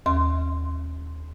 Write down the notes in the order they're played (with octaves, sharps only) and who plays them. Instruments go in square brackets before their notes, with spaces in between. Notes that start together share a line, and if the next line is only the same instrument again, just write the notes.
[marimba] D#2 C6